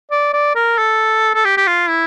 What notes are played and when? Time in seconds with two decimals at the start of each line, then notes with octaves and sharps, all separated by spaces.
0.11 D5
0.33 D5
0.56 A#4
0.78 A4
1.34 A4
1.45 G4
1.57 G4
1.67 F4
1.89 E4